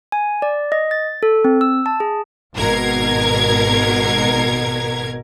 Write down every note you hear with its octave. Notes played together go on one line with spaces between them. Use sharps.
G#5
D5
D#5
A6
A4
C4
E6
A5
G#4
G#1 B2 A#4 G#6